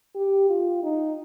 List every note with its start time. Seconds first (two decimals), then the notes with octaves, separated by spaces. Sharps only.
0.15 G4
0.50 F4
0.83 D#4